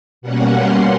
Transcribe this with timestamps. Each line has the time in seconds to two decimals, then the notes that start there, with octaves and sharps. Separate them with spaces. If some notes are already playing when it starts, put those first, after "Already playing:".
0.21 B2 G3 A#3 C#4 F#5
0.53 C6